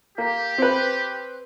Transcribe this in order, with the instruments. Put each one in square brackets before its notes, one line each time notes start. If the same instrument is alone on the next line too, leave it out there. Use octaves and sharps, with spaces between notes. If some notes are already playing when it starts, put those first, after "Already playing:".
[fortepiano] A#3 [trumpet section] G4
[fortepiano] C4 B4